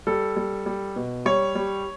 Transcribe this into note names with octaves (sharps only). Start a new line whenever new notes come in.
G3 A4
G3
G3
B2
G3 C#5
G3